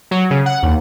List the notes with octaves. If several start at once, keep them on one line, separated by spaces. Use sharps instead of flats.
F#3
C#3
F#5
D#2